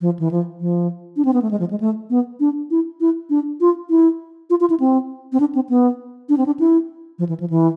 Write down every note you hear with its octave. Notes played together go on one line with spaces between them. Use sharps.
F3
E3
F3
F3
D4
C4
B3
A3
G#3
F3
G#3
A3
B3
D4
E4
E4
D4
F4
E4
F4
F4
E4
C4
C4
D4
C4
B3
D4
C4
D4
E4
F3
E3
F3
E3